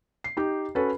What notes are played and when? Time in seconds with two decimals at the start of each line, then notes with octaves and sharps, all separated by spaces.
0.24 C7
0.37 D#4 G4
0.75 C#4 F#4 A4 B4 B5